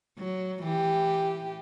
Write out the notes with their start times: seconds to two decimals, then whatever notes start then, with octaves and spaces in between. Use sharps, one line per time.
0.19 F#3
0.63 E3 G4